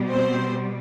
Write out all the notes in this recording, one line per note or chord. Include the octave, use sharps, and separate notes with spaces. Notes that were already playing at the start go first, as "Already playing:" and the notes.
Already playing: B2 G3
C4 C5